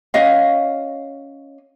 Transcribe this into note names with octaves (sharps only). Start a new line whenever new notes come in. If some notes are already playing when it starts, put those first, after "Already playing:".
C#4 F#4 D#5 F5